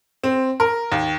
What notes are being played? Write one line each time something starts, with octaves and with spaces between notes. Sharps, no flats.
C4
A#4
D#2